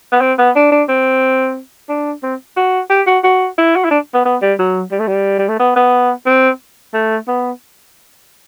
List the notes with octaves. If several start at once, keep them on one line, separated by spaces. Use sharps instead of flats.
B3
C4
B3
D4
D4
C4
D4
C4
F#4
G4
F#4
F#4
E4
F#4
E4
D4
B3
B3
G3
F#3
G3
A3
G3
G3
A3
B3
B3
C4
A3
B3